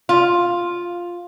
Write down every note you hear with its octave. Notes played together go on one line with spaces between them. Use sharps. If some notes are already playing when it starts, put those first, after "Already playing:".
F4